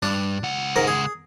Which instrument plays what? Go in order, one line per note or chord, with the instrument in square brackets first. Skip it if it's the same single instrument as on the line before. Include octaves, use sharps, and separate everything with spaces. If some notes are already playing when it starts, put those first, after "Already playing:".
[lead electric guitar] G2 [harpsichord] D4
[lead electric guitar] C#2 F#5
[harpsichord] G#2 A#4
G#4